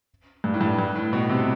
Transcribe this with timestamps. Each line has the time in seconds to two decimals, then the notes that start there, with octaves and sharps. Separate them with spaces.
0.44 G2
0.54 A2
0.61 G2
0.79 G2
0.95 A2
1.13 B2
1.29 C3